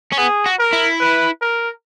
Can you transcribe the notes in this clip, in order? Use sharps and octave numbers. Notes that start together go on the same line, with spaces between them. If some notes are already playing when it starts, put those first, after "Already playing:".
C#4
B3 G#4
F#4
A#4
E4
B4
A#4